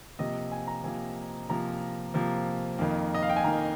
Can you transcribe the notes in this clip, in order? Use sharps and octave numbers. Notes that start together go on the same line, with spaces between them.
C3 F3 A#3 D#5
G#5
A#5
C3 F3 A#3 G#5
C3 F3 A#3 A#5
C3 F3 A#3
F2 D#3 A#3
D#5
F5
G5
G#5
F2 D#3 A#3 A#5